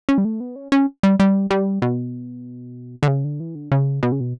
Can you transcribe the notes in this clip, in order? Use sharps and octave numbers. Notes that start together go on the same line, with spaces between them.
C#4
G3
A3
B3
C#4
C#4
G3
G3
G3
B2
D3
C#3
D3
E3
D3
C#3
B2
C#3
B2